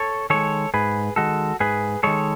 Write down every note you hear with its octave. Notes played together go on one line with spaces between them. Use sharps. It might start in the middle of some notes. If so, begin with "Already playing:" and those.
Already playing: A4 C#5
D#3 G#3 A4 C#5
G#2 G#4 B4
D#3 G#3 F#4 A4
G#2 G#4 B4
D#3 G#3 A4 C#5